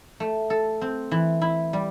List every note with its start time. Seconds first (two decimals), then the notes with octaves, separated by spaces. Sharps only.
0.20 A3
0.50 A4
0.81 C4
1.11 E3
1.42 E4
1.73 G3